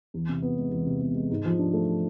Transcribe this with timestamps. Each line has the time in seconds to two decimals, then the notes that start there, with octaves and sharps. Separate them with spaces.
0.14 E2
0.29 C3
0.42 B3
0.57 G#3
0.72 E2
0.86 C3
1.02 B3
1.15 G#3
1.31 G#2
1.45 F3
1.59 D4
1.73 A3